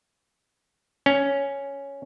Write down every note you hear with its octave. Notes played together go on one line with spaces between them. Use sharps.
C#4